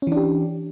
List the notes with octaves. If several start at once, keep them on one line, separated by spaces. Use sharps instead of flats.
E3 C#4 D4 G4